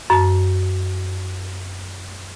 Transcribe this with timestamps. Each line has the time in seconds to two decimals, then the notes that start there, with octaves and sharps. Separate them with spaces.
0.10 F#2 A5